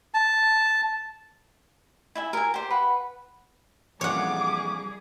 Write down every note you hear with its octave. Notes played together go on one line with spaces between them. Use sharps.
A5
E4 E5 G#5
A#4 G#5
G4 C5
B4 F#5 B5
A#1 F2 E3 G3 G#4 C#5 F#5 D6